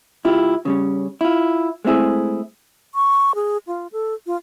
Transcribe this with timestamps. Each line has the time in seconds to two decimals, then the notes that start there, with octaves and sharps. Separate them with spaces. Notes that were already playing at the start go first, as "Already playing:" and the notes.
0.25 C#2 E4 F4 G4
0.65 C#3 G3 C#4
1.21 E4 F4
1.85 G#3 A3 C4 E4 G#4
2.95 C#6
3.35 G#4
3.67 F4
3.92 A4
4.27 F4